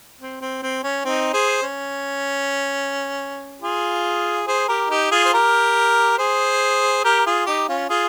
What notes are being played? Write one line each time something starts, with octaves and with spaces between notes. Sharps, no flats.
C4
C4
C4
C#4
C4 D#4
G#4 C5
C#4
F4 G#4
G#4 C5
G4 A#4
D#4 G4
F4 G#4
C5
G4 A#4
G#4 C5
G4 A#4
F4 G#4
D#4 G4
C#4 F4
F4 G#4